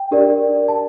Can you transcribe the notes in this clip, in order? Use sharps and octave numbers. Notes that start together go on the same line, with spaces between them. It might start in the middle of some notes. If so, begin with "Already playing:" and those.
Already playing: G5
D4 G4 A#4 D5
A5